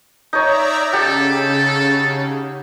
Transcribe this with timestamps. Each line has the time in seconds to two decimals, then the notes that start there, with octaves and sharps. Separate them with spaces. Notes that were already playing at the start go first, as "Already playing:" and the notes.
0.33 D#4 C#5 D5 E5 A#5
0.93 C#3 G4 A4 F#5